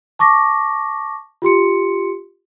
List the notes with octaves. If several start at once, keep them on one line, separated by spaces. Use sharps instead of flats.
A5 C#6 D6 A#6
F4 G4 C6 C#7